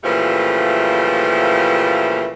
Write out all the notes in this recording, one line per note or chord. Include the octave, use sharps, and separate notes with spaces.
A#2 C#3 E3 F3 G3 A3